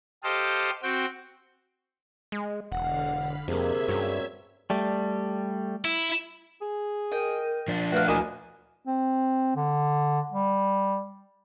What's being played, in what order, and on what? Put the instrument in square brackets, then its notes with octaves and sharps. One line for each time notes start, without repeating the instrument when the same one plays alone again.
[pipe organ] G4 A4 C5 D#5 F5
C4 F#4 G5
[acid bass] G#3
[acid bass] E1 [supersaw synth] D3 F5 [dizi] F#5
[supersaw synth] B5
[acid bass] F2 [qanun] C3 A#3 [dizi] G#4 [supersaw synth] E5 G#6
[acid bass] G2 [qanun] F#3 C4 C#4
[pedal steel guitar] G3 A3
[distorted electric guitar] E4
[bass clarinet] G#4
[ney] A#4 [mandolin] D#5 G5
[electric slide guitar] F3 D4
[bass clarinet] A3 [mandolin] F#4 A#4 F5 [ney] B4
[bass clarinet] D2 [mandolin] A#3 E4 D#5 [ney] G#5
[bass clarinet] C4
D3
G3